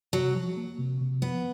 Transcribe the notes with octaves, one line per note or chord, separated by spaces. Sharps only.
C3 F#3
F3
A#3
C3
C3
F3 B3